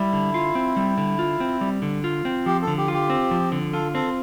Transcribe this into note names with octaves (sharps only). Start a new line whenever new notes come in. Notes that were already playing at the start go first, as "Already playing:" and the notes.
Already playing: G3 E4
D3
F4
C4
G3
D3
F4
C4
G3
D3
F4
C4
F3 G4
A4
D3
G4
F4
G4
C4
F3
D3
F4 A4
C4 A4